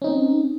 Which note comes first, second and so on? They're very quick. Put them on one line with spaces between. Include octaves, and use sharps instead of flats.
C#4 D#4 C4